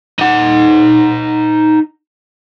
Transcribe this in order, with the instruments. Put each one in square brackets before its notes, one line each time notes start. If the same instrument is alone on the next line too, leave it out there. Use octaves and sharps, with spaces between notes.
[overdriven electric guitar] D#4 F#5